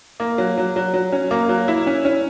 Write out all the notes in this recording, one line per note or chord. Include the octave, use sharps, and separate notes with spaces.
A#3
F#3
F#3
F#3
F#3
C#4
A#3
F#3
E4
C#4
C#4